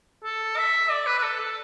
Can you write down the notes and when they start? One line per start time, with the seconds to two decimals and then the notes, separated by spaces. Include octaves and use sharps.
0.24 A4
0.57 E5
0.91 D5
1.07 B4
1.18 B4
1.23 A4
1.40 A4